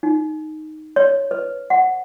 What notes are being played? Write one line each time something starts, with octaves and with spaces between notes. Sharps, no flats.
D#4
C#5
B4
F#5